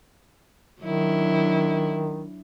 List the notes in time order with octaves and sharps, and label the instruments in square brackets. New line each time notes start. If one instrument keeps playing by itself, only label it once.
[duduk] D#3 [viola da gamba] F#3 D4 E4